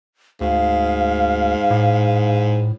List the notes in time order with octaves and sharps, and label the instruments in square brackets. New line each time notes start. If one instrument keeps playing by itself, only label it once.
[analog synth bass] D2 [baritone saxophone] G#2 [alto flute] F5
[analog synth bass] A2